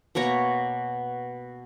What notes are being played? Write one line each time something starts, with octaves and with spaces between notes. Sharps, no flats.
B2 A#3 C#5 A#5